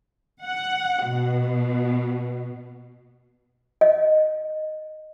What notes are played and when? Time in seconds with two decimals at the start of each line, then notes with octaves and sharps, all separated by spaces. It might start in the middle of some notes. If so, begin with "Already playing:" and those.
0.44 F#5
1.06 B2
3.81 D#5